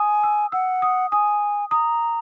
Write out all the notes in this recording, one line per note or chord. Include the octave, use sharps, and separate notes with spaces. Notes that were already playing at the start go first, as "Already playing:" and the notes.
Already playing: G#5 D#6
E6
F#5 E6
D#6
G#5 D#6
A#5 D#6